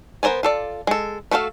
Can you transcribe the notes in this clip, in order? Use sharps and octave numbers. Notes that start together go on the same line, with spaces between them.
B3 A#4 C5 D5 G#5
F4 A4 D5
G#3 A4
A3 D4 F#4 A4 F5